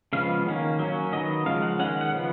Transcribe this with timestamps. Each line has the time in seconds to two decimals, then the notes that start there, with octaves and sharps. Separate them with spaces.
0.13 C#3 F3 G#3 B3 F5
0.47 D#3 A#3 C#4
0.79 F#3 A#3 C#4
1.13 D#3 F#3 B3 D#5
1.46 C#3 F3 G#3 F5
1.62 F#5
1.79 D#3 G#3 C#4 F#5
2.01 F#5
2.12 C#3 F3 B3